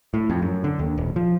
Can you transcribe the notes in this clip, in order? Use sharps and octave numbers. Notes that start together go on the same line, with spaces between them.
A2
F2
F#2
D3
D#2
D#1
F3